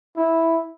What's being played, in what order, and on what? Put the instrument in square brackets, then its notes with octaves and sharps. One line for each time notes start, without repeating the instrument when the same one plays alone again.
[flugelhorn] E4